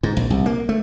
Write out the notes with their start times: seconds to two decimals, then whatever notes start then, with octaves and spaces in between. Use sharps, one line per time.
0.03 G#2
0.17 A#1
0.30 C2
0.46 A#3
0.69 A3